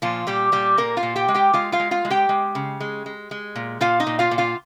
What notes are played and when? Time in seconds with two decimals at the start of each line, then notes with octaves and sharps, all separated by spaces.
0.02 A#2 F3 F4
0.27 A#2 G3 G4
0.52 A#2 G3 G4
0.77 A#2 A#3 A#4
0.97 F4 F5
1.03 A#2
1.16 G4 G5
1.28 G#3
1.34 G4 G5
1.53 G#3 F4 F5
1.72 F4 F5
1.80 G#3
1.91 F4 F5
2.05 G#3
2.10 G4 G5
2.29 G#3
2.55 C#3
2.80 G#3
3.06 G#3
3.31 G#3
3.56 A#2
3.81 A#2 F4 F5
4.00 D#4 D#5
4.07 A#2
4.19 F4 F5
4.31 A#2
4.38 F4 F5